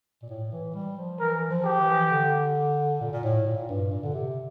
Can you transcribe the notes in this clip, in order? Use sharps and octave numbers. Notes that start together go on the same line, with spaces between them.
A#2
A2
E3
G3
F3
E3 A#4
F3
G4
E3
D3
A#2
A#2
A2
A#2
G2
A#2
D3
C3